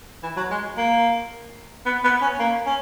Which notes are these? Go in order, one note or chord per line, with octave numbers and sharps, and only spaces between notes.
E3
F#3
G#3
A#3
B3
B3
C#4
A#3
C#4